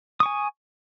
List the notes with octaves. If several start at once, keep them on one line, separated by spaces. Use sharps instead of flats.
G#5 C#6 D#6